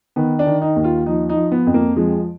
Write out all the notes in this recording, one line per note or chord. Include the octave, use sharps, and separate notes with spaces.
D#3 B3
D4
D#3
D#4
D#2
F4
F3 D#4
D#4
F3
B3
F2
A#3
F3 G#3